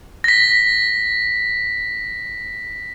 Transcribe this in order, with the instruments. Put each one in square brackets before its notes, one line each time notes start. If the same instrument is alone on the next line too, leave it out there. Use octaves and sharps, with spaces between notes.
[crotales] A#6 B6